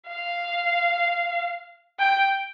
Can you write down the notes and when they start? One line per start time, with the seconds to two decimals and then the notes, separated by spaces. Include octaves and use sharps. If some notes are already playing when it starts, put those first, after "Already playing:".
0.08 F5
2.00 G5